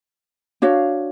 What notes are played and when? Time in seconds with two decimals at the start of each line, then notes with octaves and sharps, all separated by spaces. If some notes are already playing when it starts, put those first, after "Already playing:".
0.62 D4 F#4 C#5 F5